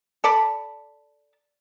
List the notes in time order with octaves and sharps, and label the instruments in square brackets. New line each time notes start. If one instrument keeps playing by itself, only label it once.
[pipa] A4 D5 A5 B5